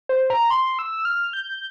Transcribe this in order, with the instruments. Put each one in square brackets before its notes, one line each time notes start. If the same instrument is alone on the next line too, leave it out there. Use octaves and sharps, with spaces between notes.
[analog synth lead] C5
A#5
C6
E6
F6
G6